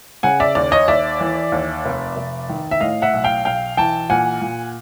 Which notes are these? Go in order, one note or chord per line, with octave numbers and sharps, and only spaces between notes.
C#3 F#5 G#5
D5 E5
D#2 D5
C#5 D#5
D#2 D5 E5
E3
D#2
F1
F1
D#3
E5
A2 D#5 F5
E5 F#5
B1
F5 G5
B1 F5 G5
E3 G5 A5
A#2 F#5 G#5
A#2